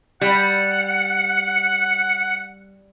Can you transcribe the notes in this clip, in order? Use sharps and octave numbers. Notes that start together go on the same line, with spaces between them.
G3 F#5